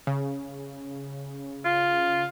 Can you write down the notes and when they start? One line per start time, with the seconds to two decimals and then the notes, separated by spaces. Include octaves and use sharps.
0.07 C#3
1.65 F4